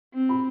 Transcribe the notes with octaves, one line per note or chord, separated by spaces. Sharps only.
C4
B5